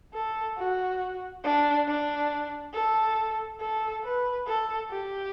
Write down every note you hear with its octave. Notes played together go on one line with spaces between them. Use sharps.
A4
F#4
D4
D4
A4
A4
B4
A4
G4